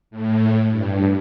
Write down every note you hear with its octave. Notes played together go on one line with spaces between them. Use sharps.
A2
G2